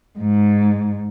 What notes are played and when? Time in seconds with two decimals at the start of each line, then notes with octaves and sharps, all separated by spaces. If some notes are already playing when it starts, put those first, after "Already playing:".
0.19 G#2